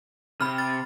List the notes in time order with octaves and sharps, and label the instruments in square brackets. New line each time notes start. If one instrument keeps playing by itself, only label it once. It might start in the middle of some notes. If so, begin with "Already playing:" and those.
[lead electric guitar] C3 [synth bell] B5 F6
[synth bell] A6